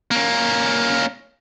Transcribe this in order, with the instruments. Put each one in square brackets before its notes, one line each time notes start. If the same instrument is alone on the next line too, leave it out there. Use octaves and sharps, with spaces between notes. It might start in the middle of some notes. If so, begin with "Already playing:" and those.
[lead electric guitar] A#3 C#4